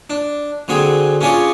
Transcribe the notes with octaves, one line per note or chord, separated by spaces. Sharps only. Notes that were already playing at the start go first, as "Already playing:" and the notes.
D4
D3 F#3 C4 G#4
C#4 D4 F4 G#4 C#5 D5